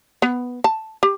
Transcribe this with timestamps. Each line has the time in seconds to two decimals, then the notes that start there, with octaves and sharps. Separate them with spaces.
0.22 B3
0.64 A5
1.03 G4